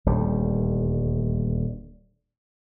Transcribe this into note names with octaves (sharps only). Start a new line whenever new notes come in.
D#1 D2 G3